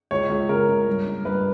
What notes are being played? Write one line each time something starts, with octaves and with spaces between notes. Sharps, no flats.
C#2 C#5
C#2
C#3 A#4
C#3
G2
G2
G2 B4